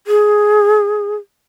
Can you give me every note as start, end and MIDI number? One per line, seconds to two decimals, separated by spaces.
0.07 1.15 68